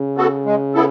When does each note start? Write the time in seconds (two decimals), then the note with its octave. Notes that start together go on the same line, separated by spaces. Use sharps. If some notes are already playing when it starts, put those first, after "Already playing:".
Already playing: C#3
0.17 B3 F#4 A4
0.45 G#3
0.74 B3 E4 A4